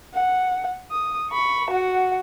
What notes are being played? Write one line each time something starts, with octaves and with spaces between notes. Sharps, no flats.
F#5
D#6
B5 C#6
F#4 F#5